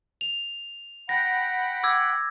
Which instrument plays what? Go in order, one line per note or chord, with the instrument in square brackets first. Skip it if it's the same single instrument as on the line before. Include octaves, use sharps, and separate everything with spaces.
[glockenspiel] F7
[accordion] F#5 G5 B5 [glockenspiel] A#6
[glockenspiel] D6 E6 G#6